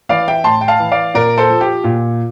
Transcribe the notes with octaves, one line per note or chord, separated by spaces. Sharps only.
E3 D5 F5
E5 G5
A2 A5 C6
G5
F5 A5
E3
D5 F5
A#2 A#4 D5
A4 C5
F3
G4
A#2